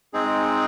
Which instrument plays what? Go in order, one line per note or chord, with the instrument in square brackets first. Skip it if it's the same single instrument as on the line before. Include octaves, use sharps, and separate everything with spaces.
[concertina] G#3 C4 D#4 G#4